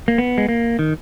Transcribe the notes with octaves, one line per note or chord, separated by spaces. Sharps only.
A#3
B3
G#3
A#3
D#3